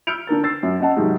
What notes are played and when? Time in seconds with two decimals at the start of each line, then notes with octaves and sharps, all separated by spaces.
0.07 E6 F6 G6 C#7 D7 F7
0.27 D3 D4 A#4 A6
0.44 E6 A6 C7
0.63 F#2
0.80 C#4 D#5 F#5 A5
0.96 G#2 C3 D#3 F#3 G3